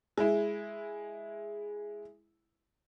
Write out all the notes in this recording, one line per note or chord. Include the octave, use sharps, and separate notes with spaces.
G#3 E4